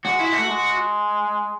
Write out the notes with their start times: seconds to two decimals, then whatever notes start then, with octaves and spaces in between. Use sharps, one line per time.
0.05 G#3 F#4
0.19 E4
0.33 A3 F#4
0.48 G#3